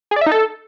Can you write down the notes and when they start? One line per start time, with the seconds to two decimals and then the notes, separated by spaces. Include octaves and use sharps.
0.11 G#4
0.16 D5
0.21 E5
0.26 D#4
0.32 A4